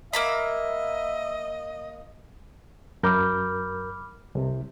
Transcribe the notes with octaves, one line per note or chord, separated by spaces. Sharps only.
A#3 D#5 E5 A#5 B5
F#2 A#4 B5 D6 F6 G6
C2 C3